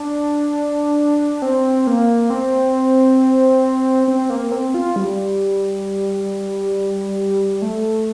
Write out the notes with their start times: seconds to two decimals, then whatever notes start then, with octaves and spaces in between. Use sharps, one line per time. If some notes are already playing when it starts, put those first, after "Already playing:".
Already playing: D4
1.42 C4
1.87 A#3
2.30 C4
4.08 C4
4.30 A#3
4.52 C4
4.74 F4
4.96 G3
7.62 A3